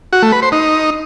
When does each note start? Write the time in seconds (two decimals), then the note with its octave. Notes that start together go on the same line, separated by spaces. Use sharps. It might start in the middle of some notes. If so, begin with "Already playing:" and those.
0.13 F#4
0.22 A3
0.32 B4
0.42 C5
0.52 D#4